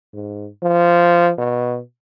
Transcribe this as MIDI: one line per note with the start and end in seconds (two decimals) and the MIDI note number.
0.14 0.48 44
0.63 1.31 53
1.38 1.79 47